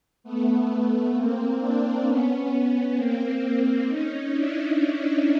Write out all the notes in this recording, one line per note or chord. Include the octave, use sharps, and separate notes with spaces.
A3 B3
A#3 C4
C4 D4
B3 C#4
B3 C#4
A#3 C4
C#4 D#4
D4 E4